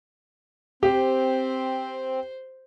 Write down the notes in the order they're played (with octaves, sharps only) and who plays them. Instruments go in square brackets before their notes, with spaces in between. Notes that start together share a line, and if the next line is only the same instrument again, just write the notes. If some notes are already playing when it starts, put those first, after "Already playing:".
[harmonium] C4 [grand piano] G4 [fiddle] C5